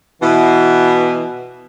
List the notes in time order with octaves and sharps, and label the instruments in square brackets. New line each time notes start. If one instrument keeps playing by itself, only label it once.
[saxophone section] B2 E3